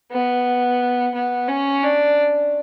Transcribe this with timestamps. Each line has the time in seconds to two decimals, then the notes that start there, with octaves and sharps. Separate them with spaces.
0.11 B3
1.14 B3
1.48 C#4
1.83 D4